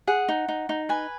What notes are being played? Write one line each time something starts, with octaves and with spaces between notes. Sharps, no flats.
G#4 F#5
D#4
D#4
D#4
B4 G#5